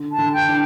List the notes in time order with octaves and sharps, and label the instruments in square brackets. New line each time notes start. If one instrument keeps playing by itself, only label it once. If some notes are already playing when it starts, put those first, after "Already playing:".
Already playing: [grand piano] D3
[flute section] A5
[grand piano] D3
[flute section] G5
[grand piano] D4